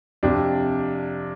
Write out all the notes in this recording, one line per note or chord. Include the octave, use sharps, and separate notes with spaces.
F2 C3 D4